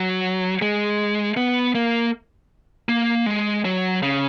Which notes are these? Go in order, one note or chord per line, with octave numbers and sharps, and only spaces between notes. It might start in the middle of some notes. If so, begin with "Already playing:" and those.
Already playing: F#3
G#3
B3
A#3
A#3
G#3
F#3
C#3